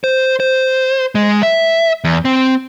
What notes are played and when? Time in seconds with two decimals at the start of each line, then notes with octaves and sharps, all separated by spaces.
0.04 C5
0.40 C5
1.15 G#3
1.43 E5
2.04 E2
2.25 C4